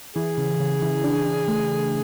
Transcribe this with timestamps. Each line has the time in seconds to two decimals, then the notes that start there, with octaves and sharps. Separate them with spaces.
0.16 E3 G#4
0.38 C#3
0.60 C#3
0.82 E3
1.04 D4
1.26 D4
1.48 A3